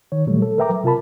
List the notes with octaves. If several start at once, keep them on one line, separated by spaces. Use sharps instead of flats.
D#3 C#5
A#2 E3 F#3 G3 A3
A4
A#4 B4 E5 G5 A#5 D6
F#3
C3 F4 A#4 A5 B5